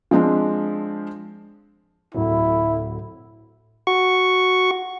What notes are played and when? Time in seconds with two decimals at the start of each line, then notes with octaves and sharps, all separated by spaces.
0.11 F3 G#3 C4 D4
2.15 D1 A2 F#3 E4
3.87 F#4 C#6